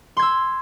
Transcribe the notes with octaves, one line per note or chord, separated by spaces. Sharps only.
C6 E6 G#6